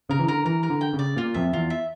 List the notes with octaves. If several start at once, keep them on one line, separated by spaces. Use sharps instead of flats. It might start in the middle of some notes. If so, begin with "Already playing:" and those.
C#3 A#4
E3
D3 A#4
E3 A#4
A#4
D3
G5
C#3
D5
A#2 F4
F2 E5
E2 F4
E5